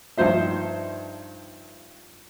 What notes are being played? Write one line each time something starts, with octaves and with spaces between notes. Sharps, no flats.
G2 F3 D#4 C5 E5